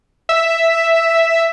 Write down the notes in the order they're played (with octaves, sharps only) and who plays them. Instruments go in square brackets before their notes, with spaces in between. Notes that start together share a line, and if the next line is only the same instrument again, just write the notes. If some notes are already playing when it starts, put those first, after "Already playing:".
[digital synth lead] E5